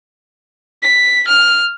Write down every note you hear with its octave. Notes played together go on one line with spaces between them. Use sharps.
B6
F6